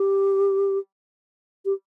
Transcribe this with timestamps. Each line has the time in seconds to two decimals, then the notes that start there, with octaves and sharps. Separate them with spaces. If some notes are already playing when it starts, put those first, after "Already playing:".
Already playing: G4
1.65 G4